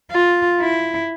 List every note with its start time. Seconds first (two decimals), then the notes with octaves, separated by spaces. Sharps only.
0.12 F4
0.61 E4